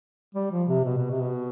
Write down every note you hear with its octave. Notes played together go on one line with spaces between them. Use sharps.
G3
F3
C3
B2
B2
C3
B2